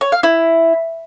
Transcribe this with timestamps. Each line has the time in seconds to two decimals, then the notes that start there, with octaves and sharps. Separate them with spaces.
0.01 C#5
0.12 F5
0.23 E4